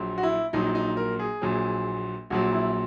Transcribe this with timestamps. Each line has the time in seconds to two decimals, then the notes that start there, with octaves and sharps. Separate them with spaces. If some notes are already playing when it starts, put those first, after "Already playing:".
Already playing: A#1 A#2 F#3
0.18 F#4
0.23 E4
0.53 A#1 A#2 F#3 D#4
0.75 D#4
0.97 A#4
1.19 G#4
1.42 A#1 A#2 F#3
2.30 A#1 A#2 F#3 F#4
2.52 E4